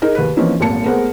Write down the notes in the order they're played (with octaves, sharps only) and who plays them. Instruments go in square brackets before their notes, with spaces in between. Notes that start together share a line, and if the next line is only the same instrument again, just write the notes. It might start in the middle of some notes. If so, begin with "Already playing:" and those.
[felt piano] D#4 G#4 A#4
D#2 B4
E3 F3 A#3 C4 C#4 D#4
D#1 G#1 A#3 A5 C#7
G#3 A3 B3 A#4 C5 F#5